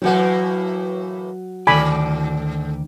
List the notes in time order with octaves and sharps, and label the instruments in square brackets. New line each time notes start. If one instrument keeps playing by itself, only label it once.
[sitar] A2 E3 A#3 [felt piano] F#3 F#5
[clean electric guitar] D2 D#3 D5 [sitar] G#2 A4 [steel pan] G#5 B5